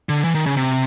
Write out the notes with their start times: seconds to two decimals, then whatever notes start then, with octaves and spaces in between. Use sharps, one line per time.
0.09 D3
0.24 E3
0.35 D#3
0.46 C#3
0.57 C3